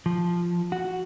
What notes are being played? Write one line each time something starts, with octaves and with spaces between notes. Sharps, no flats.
F3
F#4